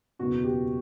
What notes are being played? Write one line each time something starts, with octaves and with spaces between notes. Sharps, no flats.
F#1 E2 B2 F#4
G4